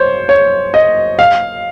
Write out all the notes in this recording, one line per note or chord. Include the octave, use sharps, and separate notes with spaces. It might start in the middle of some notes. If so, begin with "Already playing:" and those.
Already playing: C5 C#5
C#5
D#5
F5